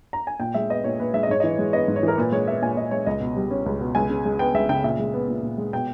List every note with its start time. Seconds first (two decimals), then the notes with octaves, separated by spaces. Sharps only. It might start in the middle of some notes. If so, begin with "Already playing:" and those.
0.13 A#5
0.27 G#5
0.40 A#2 G5
0.54 G#3 E5
0.69 B3 D#5
0.84 A#2 C#5
1.00 A#2 B4
1.14 G#3 E5
1.23 D#5
1.29 G#2 C#5
1.40 E3 D#5
1.59 G#3
1.73 B3 D#5
1.88 G#2
1.96 C#5
2.03 E3 A#4
2.18 A#2 B4
2.32 G#3 C#5
2.47 B3 E5
2.62 A#2 G#5
2.77 A#2 D#5
2.91 G#3 C#5
3.06 C#2 D#5
3.21 B2
3.36 G3
3.51 C#4
3.66 C#2
3.81 B2
3.95 C#2 G#5
4.10 C#3
4.25 G#3
4.39 B3 G5
4.54 C#2 E5
4.69 C#3 G5
4.84 A#2 E5
4.99 G#3
5.14 B3
5.28 A#2
5.43 A#2
5.58 G#3
5.73 B2 G5